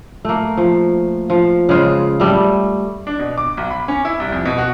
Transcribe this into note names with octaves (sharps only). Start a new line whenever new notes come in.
A3 A#3
F3
F3
C#3 G#3 F4
G3 A3
D4
B2
D6
B1
B5
C#4
E4
C2
F2
B2
F#4